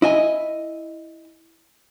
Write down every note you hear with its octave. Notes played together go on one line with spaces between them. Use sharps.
E4 D#5 G#5